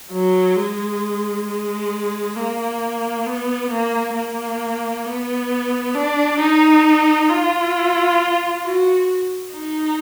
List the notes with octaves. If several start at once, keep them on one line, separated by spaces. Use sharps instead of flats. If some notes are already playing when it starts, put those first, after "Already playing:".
F#3
G#3
G#3
A#3
B3
A#3
A#3
B3
D4
D#4
F4
F#4
D#4